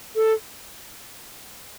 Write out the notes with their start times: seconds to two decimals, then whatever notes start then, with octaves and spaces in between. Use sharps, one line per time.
0.16 A4